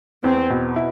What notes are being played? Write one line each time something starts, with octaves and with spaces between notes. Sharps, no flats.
E2 C4
B2
E4